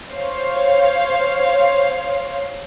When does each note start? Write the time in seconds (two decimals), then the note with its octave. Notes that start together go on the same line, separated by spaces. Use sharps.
0.11 C5 C#5 F5